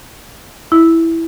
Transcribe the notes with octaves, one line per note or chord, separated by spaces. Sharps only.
E4